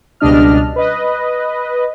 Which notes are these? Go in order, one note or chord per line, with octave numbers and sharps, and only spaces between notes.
C#2 B2 G3 D4 D#5 F6
B4 D#5